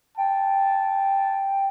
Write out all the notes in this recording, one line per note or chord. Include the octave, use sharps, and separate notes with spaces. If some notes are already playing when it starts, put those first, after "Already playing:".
G5 A5